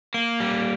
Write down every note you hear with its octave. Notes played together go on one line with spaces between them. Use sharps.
A#3
G3